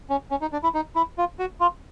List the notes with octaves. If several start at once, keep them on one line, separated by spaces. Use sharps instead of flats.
C#4
C#4
D#4
D4
E4
D#4
E4
F4
F#4
F4